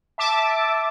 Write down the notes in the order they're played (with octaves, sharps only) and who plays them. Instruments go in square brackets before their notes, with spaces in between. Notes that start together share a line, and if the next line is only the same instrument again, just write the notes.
[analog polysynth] E5 A5 D6